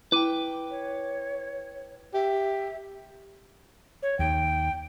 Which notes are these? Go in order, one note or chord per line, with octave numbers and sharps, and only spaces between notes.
E4 B4 G5 D6 D#7
C#5
G4 E5
C#5
D#2 G5